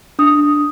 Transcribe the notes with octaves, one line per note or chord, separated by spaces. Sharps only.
D4 D#6